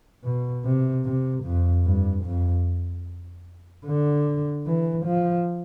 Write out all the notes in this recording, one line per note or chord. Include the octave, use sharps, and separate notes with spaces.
B2
C3
C3
F2
G2
F2
D3
E3
F3